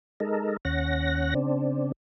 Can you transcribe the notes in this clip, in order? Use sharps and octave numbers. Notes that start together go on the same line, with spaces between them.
G#3 D#4 A4 A#4
D#2 C#4 F#5 A#6
C#3 C4 D4